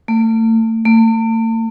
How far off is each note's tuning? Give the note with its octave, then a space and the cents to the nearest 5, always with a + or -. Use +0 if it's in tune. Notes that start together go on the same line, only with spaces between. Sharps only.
A3 +40
A3 +45